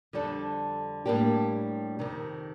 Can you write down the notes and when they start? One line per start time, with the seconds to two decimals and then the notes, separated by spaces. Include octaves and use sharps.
0.13 F2 D3 G3 D4 A4
1.06 A2 G3 A#3 D4 G4
1.99 F2 C3 D#3